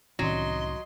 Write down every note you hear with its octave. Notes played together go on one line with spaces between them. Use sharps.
C2 A2 D#3 F#3 C4 C#4 D#5 C6